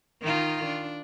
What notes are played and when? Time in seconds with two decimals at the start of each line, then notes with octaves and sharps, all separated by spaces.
0.21 D#3 D#4 F4
0.65 D4